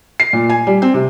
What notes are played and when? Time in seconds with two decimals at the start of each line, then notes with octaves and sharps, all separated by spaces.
0.20 C7
0.33 A#2
0.49 G#5
0.67 G3
0.82 C4
0.94 C3